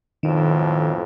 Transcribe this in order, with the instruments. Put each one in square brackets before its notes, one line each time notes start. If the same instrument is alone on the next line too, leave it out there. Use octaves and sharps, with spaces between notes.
[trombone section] B1 F2 A2 [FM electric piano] D#3